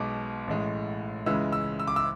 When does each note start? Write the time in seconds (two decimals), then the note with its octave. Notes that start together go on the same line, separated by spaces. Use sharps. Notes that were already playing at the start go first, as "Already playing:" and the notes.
Already playing: B1 B2 G#3 D6
0.47 A1 A2 G#3
1.26 C#2 C#3 E3 G#3 E6
1.52 E6
1.79 E6
1.87 D6
1.96 E6